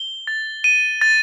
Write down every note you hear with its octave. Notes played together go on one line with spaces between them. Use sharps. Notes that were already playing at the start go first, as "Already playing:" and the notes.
Already playing: G7
A6
D#7
A6